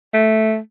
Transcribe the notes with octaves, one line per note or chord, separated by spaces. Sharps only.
A3